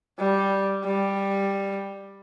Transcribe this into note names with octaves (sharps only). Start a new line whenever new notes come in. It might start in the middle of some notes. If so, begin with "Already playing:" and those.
G3
G3